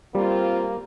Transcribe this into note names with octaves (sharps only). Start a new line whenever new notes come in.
G3 A#3 C4 F4